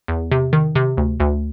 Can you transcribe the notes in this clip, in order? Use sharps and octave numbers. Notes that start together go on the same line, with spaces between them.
E2
C3
D#3
C3
D2
D2